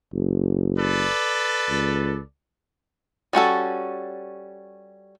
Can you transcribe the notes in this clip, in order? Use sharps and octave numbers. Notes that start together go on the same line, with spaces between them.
F#1
A4 B4 D5
C#2
G3 C#4 F#4 A4